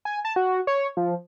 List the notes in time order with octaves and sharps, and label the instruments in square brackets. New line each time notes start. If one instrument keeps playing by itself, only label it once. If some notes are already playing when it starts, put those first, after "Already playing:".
[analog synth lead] G#5
A5
F#4
C#5
F3